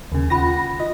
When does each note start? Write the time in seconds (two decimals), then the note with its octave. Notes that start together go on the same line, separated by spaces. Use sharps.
0.12 D#2 C#3
0.30 C#4 F4 F#5 B5 A#6
0.80 F4 D#5